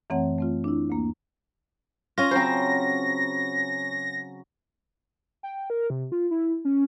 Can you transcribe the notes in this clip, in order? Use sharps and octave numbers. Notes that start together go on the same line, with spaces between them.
F#2 E3 A3 C4 C#5 F#5
A3 C4 F4
D4 E4
D2 A#3
C#4 F4 A#6
C#3 F#3 C4 C5
G5
A#4
C3
F4
E4
C#4